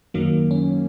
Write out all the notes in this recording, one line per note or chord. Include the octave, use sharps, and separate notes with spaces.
F#2 D#3 F#3 A#3
C#4